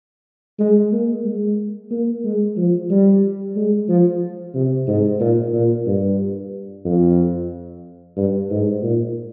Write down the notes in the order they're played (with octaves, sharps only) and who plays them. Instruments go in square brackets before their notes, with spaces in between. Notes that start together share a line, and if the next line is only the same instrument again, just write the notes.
[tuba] G#3
A#3
G#3
A#3
G#3
F3
G3
G#3
F3
C3
G#2
A#2
A#2
G2
F2
G2
G#2
A#2